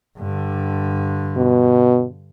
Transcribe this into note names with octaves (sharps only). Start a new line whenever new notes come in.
G2 D3
B2